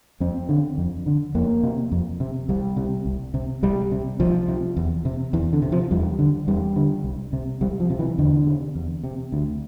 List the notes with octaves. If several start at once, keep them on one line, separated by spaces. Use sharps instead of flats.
F2 C4
D3
F2
D3
F2 A#3
C3
F2
C3
C2 G3
C3
C2
C3
C2 G3
C3
C2 F3
C3
E2
C3
E2 E3
D3
C3
F3
E2 G3
D3
E2 G3
D3
C2
C3
C2 G3
F3
C3
E3
E2 D3
C3
E2
C3
D2